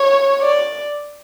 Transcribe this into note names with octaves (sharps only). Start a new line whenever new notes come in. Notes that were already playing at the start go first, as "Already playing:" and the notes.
Already playing: C#5
D5